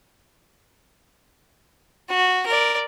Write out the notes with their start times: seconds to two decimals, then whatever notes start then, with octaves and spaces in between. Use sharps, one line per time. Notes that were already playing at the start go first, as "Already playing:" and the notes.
2.09 F#4
2.47 A#4 D5